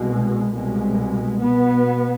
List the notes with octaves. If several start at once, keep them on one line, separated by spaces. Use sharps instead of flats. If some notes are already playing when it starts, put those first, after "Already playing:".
Already playing: C2 B2 G#3
C2 B2 G#3
B2 B3